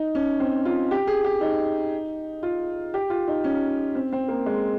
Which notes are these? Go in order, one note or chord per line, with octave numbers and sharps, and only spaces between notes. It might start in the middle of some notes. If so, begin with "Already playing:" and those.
Already playing: D#4
C#4
C4
F4
G4
G#4
G4
D#4
F4
G4
F4
D#4
C#4
C4
C4
A#3
G#3